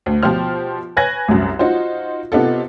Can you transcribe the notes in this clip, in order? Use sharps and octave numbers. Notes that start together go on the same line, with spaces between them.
D2
B2 F3 F4 G4 C5 F6
B4 C#5 G#5 F#6 G#6 A#6
C2 F#2
D#4 F4 F#4 C5
C3 B3 D#4 F4 A4